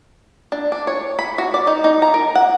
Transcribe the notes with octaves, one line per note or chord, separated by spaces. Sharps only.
D4
D4
C#5
B5
F#4
D5
D#4
D#4
A#5
A#4
F#5